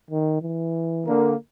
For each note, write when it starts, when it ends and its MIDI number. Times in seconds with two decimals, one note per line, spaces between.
0.10 0.40 51
0.41 1.11 52
1.06 1.33 50
1.06 1.33 58